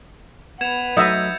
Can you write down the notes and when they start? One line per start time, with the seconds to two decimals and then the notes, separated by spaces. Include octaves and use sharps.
0.61 B3 B4 F#5 G#6 E7 F7
0.97 F#3 A3 D#4 D#5 E5 G6 A6 C#7